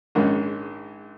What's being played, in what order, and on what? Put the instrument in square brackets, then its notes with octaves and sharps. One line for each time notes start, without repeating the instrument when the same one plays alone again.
[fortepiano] A#1 G#2 D#3 G#3 C#4